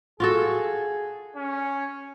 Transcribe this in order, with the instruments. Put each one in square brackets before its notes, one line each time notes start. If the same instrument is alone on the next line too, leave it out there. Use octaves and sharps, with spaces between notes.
[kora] F4 F#4 A4 [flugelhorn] G#4
[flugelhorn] C#4